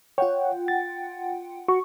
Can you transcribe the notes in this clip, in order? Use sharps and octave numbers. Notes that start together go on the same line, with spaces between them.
F4 C#5 F#5 G5
A6
F#4 C#6